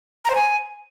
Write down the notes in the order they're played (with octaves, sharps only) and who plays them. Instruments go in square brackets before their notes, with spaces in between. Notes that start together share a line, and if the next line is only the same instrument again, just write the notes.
[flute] A#5
C5
G#5